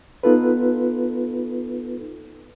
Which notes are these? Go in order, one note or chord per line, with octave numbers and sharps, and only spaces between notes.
B3 D#4 F4 A4 B4